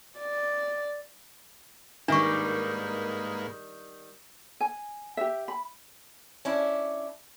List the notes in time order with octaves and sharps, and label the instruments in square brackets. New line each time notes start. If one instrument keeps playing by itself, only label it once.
[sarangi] D5
[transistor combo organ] G#2 A#3 B4 [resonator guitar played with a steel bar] D#3 G3 [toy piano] D4 C#6
[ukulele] G#5
G4 E5
B5
[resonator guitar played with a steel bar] C#4 D4 E4